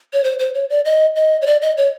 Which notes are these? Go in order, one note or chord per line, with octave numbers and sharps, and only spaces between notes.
C#5
C5
C5
C#5
D5
D#5
D#5
C#5
D5
D#5
C#5